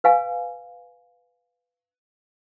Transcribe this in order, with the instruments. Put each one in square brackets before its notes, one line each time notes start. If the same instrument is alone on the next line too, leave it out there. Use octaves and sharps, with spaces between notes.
[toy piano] B4 F5 G#5